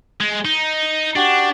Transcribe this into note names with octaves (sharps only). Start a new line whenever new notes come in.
G#3
D#4
D4 F#4 G4